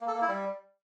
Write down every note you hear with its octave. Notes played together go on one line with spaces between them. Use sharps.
A#3
A4
A#3
E4
G3